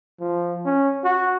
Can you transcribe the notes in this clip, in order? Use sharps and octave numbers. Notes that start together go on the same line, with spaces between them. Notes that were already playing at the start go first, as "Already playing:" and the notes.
F3
C#4
F#4